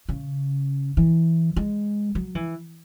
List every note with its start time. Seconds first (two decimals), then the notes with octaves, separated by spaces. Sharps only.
0.09 C#3
0.97 E3
1.56 G#3
2.15 F#3
2.35 E3